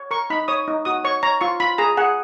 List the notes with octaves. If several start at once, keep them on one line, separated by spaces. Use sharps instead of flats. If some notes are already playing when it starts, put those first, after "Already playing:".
Already playing: C#5
A#4 C#6
D#4 B5
C#5 D#6
D#4
F#4 D#6
C#5 C#6
C#5 A#5
F4 C#6
F4 B5
G#4 A#5
G#4 F#5